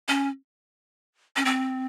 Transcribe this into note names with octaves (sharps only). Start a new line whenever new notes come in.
C#4
C#4
C4